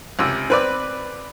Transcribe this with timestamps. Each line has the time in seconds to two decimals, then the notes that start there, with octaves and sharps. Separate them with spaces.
0.19 C#2 C3 E6
0.50 C4 B4 D5